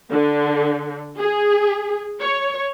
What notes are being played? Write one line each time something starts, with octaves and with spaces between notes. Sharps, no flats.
D3
G#4
C#5